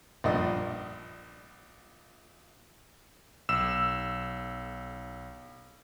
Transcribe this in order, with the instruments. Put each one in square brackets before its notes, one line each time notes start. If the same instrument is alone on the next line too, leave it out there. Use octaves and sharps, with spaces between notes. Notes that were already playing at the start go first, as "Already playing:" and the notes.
[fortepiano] A#1 G2 F3 D#5
[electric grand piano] B1 E6 E7